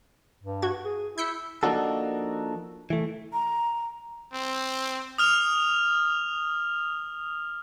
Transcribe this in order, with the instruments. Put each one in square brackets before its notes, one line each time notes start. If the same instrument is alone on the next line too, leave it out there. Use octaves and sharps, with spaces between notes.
[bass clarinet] G2
[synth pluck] F#4 G#6
[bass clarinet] G#4
[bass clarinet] E4 [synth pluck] G6 B6 C#7
[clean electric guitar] F3 A#3 D4 D#4 F#4 A4
E3 A3
[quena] A#5
[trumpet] C4
[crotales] D#6 F6 F7